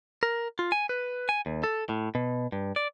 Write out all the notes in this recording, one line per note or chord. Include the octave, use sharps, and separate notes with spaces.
A#4
F4
G#5
B4
G#5
D#2
A4
A2
B2
G2
D5